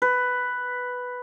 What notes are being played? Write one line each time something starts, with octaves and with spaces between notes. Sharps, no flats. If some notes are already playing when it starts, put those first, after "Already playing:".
B4